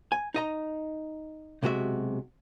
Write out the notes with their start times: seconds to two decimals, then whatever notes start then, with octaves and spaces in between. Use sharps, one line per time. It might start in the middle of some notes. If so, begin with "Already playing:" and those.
0.12 G#5
0.34 D#4 D#5 A#5
1.63 B1 C3 G#3 F#4 E5